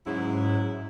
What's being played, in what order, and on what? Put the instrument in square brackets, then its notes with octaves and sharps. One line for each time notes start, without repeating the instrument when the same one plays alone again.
[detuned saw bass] G#2 [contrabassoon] C#3 [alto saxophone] F#3 [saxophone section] E4